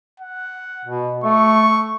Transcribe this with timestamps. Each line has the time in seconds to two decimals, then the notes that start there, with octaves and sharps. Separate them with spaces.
0.20 F#5
0.85 B2
1.24 A3 C#6